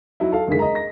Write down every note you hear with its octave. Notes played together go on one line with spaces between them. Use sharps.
F#3 D#4 E4
A4 F5
F#1 D3 D#3 G#3 G#4 B6
D#5 A#5
A#6